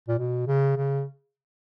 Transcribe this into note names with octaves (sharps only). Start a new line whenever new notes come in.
A#2
B2
C#3
C#3